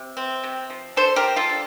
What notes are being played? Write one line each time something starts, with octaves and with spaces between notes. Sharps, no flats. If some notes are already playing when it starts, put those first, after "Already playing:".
Already playing: C3
C4
C3
F3
D3 A4 C5
G4 A#4
G3
F4 A4
D3